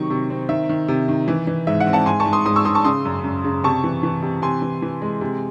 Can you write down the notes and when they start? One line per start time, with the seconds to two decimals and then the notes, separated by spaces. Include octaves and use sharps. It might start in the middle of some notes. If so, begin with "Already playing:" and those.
Already playing: C3 D#3 F#3 C#6
0.10 C3
0.30 C4
0.49 D#3 E5
0.69 D#3
0.88 C3
1.08 D#3
1.28 E3
1.47 E3
1.67 G#2 E5
1.80 F#5
1.87 C4
1.93 F#5 A5
2.06 G#2 G#5 C6
2.20 A5 C#6
2.26 G#2
2.33 C6 D#6
2.46 G#2 C6 D#6
2.56 C#6 E6
2.65 G#2 C6 D#6
2.75 A5 C#6
2.85 C#3 C6 D#6
3.05 F#2
3.24 F#2
3.44 C#3
3.64 C3 A5 C#6
3.84 E3
4.03 E3
4.22 C3
4.42 C3 G#5 C6
4.62 E3
4.82 E3
5.02 G#3
5.21 C3